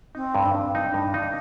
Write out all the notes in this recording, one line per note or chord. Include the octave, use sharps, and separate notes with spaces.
C4 D#4
G2
D4
G2
D4 D#4
G2
D#4